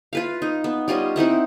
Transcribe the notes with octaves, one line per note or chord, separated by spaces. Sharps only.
F4 B4 F5
D#4
B3
G3 C#4 F4 D#5
C4 D#4 E4 F#5